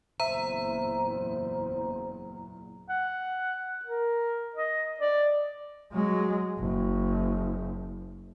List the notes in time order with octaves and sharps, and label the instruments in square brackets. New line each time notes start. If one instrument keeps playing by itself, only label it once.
[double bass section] F#1 E2 A#2 [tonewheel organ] C5 [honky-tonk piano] E5 [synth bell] A#5
[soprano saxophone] F#5
A#4
D#5
D5
[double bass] F#3 G#3
F#1